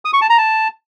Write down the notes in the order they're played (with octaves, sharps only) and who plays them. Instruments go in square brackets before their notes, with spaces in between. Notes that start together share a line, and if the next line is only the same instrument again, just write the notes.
[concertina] D#6
C#6
A5
A#5
A5